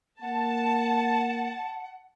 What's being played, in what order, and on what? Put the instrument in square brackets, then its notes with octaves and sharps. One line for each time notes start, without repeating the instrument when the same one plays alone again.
[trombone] A#3 [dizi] F#5 [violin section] A5